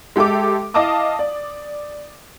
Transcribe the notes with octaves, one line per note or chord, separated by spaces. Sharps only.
G#3 G4 A4 E5 D6
E4 D#5 F5 A5 D6 D#6
D5